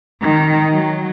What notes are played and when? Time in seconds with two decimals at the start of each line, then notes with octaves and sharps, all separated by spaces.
0.21 D#3
0.72 F#3